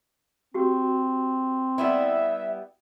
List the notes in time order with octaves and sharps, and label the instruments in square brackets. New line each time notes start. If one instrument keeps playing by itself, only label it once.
[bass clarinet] C4 [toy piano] F#4 G4
[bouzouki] G3 B3 E4 [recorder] E5